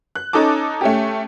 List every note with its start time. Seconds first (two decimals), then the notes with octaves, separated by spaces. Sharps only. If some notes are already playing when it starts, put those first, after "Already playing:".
0.15 F#6
0.33 C#4 D#4 A4 A5 D6
0.81 A3 C#4 G4